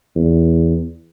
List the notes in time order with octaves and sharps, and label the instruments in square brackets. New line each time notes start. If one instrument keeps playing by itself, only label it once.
[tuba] E2